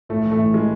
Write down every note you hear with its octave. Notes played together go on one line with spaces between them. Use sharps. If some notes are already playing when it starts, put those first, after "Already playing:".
A2 A3
E3
A3
A2
E3 G#3